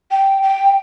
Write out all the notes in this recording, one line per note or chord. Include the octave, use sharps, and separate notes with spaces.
G5
G5